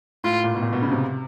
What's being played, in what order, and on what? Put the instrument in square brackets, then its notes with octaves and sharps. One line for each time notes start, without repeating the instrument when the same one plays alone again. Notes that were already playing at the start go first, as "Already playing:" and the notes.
[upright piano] A2 [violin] F4
[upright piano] A#2
B2
A#2
B2
C#3
C3